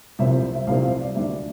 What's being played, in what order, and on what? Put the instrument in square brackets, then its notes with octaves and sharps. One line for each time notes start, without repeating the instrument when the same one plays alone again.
[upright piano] C2 C3 F3 C4 E5
C5
C5
E5
C2 C3 F3 C4 F5
F5
D5
D2 D3 G3 D4 E5